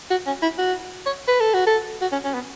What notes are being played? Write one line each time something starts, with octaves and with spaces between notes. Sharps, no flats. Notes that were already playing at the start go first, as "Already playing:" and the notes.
F#4
C#4
E4
F#4
C#5
B4
A4
F#4
A4
F#4
C#4
C#4
B3